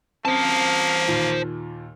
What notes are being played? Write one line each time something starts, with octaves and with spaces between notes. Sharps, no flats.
A#3 C4 C#4 C5 A5
D#2 A#2